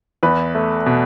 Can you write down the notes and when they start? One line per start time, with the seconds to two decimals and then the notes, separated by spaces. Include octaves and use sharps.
0.23 E2 B4
0.55 A3
0.86 B2